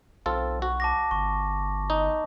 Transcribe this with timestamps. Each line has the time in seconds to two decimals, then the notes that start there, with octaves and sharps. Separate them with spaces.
0.26 B1 C4 F4 A4
0.62 F#4
0.80 A5 D6 A#6
1.11 G1 C#6
1.90 D#4